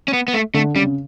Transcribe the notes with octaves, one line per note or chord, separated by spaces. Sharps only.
C#4
B3
B3
A3
D3 A3
C#3 G3
C#3